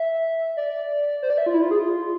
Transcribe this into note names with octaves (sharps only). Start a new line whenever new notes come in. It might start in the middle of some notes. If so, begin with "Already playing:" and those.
Already playing: E5
D5
C5
D5
E5
F4
E4
F4
G#4
F4